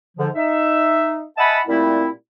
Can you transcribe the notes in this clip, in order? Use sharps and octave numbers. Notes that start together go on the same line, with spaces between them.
G#2 D3 F3
D#4 E5
D#5 E5 F#5 G#5 A5 B5
A#2 G3 A3 C4 E4